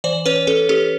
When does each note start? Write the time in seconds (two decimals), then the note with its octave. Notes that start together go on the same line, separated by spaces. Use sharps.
0.04 E3 C5 D5
0.26 C#4 B4 C#5
0.47 C#4 A4 B4
0.69 C#4 G4 A4